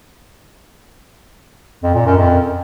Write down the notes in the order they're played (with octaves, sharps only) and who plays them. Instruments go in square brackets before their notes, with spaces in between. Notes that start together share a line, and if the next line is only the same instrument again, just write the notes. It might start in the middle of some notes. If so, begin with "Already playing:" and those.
[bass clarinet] F2
A#2
F#2
F2